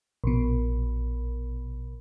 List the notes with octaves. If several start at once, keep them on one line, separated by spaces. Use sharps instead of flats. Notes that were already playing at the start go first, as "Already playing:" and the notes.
A#1 B2